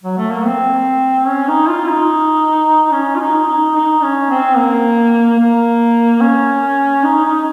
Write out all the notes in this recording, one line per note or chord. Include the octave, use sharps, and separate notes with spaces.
F#3
A3
A#3
C4
C#4
D#4
F4
D#4
C#4
F4
D#4
D#4
D#4
C#4
C4
A#3
A#3
C#4
D#4
D#4